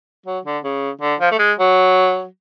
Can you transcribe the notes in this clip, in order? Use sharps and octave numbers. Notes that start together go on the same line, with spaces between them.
F#3
D3
C#3
D3
F3
A3
G#3
F#3